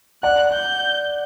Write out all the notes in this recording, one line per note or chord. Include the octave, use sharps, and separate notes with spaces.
D5 F#5 F#6
G6